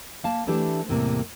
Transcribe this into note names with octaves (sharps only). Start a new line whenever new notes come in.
A#3 F5 A5
E3 A3 D4 E4 G4
E2 A2 C3 G3 A#3